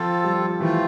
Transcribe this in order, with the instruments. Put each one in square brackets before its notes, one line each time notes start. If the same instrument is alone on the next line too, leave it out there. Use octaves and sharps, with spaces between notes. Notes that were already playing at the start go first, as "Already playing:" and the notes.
Already playing: [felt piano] F3 [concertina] C4 F4 A4
[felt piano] G3
[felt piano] E3 [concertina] A3 C4 F4